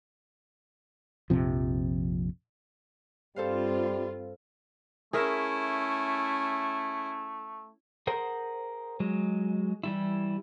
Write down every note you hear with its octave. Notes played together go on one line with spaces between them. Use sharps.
A#1 F2 C3 F3
G2 G3 C4 F4 A4 C5 F5
A3 C#4 E4 G#4 A#4 E5
G#4 A#4 C5 F#5
F#3 G#3
E3 G3 E4